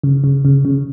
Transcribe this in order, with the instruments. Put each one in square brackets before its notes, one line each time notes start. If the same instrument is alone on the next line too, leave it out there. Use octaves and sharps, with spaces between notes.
[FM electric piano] C#3
C#3
C#3
C#3